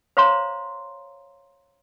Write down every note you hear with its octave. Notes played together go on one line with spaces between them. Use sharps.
C5 C#5 F5 A#5 C6